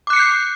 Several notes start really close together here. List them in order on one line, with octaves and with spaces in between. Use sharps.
D6 F#6 C#7 C7 G6